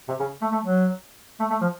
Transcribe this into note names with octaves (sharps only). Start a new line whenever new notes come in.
C3
C#3
A3
A3
F#3
A3
A3
F3